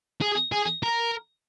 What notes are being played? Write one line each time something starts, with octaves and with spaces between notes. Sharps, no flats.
G#4
G#4
A#4